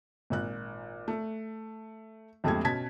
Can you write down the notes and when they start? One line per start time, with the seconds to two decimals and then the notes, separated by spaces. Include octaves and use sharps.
0.30 G#1 A#2 F#6
1.08 A3
2.44 A#1 F2 G#3 A3 G4 G#6
2.64 B2 C#4 A5 G#6 B6